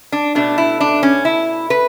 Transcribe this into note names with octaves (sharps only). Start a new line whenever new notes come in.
D4
B2 A3 D4
E4
D4
C#4
E4
B4